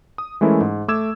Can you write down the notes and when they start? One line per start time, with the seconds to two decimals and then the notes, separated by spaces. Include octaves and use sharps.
0.18 D#6
0.41 E3 G#3 A3 C#4 E4 A#4
0.61 G#2
0.88 A3 D6 E6 G#6 E7